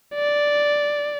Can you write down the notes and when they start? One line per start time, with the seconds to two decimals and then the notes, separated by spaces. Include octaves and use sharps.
0.15 D5